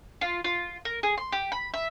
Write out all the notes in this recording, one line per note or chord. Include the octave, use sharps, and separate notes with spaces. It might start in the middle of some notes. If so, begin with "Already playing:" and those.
F4
F4
A#4
G#4
C6
G4
B5
E5